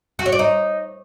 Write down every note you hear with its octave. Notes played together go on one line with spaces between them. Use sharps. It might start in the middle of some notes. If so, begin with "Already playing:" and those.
F#4
C#5
D5
D#4